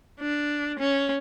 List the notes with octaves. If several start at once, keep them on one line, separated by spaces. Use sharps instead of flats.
D4
C#4